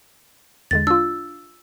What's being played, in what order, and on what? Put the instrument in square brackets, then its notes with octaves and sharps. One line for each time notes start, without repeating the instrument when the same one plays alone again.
[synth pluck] E2 D3 G#3 [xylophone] A6
[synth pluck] D4 F4 [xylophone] E6